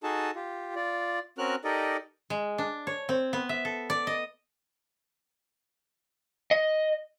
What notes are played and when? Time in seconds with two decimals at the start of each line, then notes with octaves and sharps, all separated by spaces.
0.03 D#4 F#4 G#4 A4 A5
0.35 F4 G4
0.76 F4 D5
1.38 C4 C#4 F#4 A#4 F6 F#6
1.64 D#4 G4 A4 A#4 D5 D#5
2.30 G#3
2.58 D4
2.87 C#5
3.09 C4
3.33 B3
3.49 E5
3.65 A4
3.90 D5
4.07 D#5
6.51 D#5